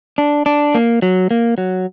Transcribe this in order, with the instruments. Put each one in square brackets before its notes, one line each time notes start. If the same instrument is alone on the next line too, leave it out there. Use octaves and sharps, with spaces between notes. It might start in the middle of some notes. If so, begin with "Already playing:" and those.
[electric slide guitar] D4
D4
A#3
F#3
A#3
F#3